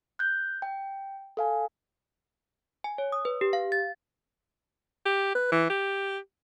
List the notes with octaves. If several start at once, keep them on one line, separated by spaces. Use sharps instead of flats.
F#6 G6
G5
A4 F5 G#5
G#5
C#5
D#6
B4
G4
F5
A6
G4
B4
E3
G4